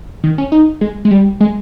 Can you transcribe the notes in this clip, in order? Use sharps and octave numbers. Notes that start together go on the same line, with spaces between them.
D#3
C#4
D#4
G#3
G#3
G3
G#3